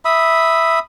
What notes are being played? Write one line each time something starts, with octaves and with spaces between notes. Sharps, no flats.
E5 B5 D#6